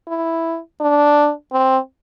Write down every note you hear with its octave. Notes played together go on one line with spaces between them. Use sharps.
E4
D4
C4